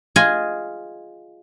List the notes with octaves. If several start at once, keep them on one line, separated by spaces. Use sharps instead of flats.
F4 G#4 D#5 G#5